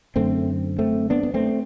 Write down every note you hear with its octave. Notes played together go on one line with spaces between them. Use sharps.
F#2 D3 A3 C4
A3 C4
B3 D4
B3
A3 C4